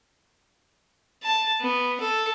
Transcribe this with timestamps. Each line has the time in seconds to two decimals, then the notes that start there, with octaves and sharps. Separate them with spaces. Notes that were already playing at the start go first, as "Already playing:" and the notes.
1.23 A5
1.61 B3
2.01 A4